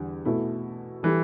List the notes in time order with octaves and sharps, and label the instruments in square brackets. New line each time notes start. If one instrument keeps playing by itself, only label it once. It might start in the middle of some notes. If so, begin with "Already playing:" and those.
Already playing: [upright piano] E2 D3 G3
B2 A3 E4 A4
[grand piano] E3 [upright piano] G3 E4 A4